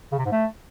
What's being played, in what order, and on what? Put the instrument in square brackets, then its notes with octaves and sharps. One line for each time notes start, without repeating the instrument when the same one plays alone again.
[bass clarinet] C#3
C3
G#2
A3